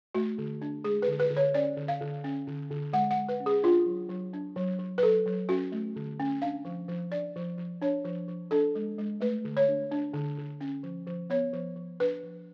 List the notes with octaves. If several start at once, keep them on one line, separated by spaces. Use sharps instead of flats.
A3 F#4
D3
D4
G#3 G#4
B4
D3
B4
D3
C#5
C#4 D5
D3
F5
D3
C#4
D3
D3
G#3 F#5
F#5
G#3
B4
C#4
G#4
D4 F4
F#3
F#3
D4
F#3
F#3
B4
F#3 A4
F#3
C#4 F#4
A3
D3
C#4
D4 F5
F3
F3
D4 D5
F3
F3
D4 C#5
F3
F3
D4 A4
G#3
G#3
A3 B4
D3
C#5
D4
D4
D3
D3
C#4
F3
F3
B3 C#5
F3
F3
D4 B4
F3